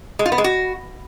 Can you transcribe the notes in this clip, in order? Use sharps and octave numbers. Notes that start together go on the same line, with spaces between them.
G#3
F4
B3
G#3
F#4